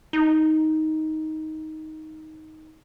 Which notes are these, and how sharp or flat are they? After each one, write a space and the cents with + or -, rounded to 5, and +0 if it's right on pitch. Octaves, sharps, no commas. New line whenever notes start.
D#4 +10